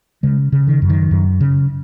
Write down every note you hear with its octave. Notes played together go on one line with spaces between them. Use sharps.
C#3 G#3
C#3
D#3
F#2
D#3
F#2
C#3